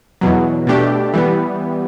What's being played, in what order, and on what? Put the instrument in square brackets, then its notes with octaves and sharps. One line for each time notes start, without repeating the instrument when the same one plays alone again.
[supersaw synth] E2 B2 F#3
B2 A3 D4 G4
E3 G3 B3